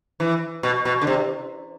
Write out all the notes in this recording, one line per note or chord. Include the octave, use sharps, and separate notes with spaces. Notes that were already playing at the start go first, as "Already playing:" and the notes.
E3
B2
B2
D3
C3